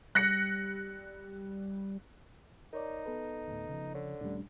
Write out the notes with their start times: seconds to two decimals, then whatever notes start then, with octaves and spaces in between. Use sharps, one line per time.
0.15 G3 F#6 A#6 C#7
2.73 D#4 A#4 C#5 D5
3.06 B3 A4 B4
3.47 D2 A2
3.69 C#3 F3
3.94 D3 C#5
4.21 A#1 D#2 G3 A3 C#4 D4